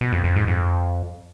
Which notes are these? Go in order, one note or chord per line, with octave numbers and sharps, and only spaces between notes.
B2
F2
F2
G#2
F2